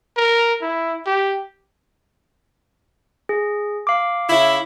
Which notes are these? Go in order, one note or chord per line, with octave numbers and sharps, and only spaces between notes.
A#4
E4
G4
G#4
F5 D6
C#3 E4